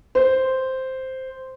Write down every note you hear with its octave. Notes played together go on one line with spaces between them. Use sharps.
C5